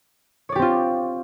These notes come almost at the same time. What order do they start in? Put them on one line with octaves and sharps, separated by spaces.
C#5 D5 G4 C4 F4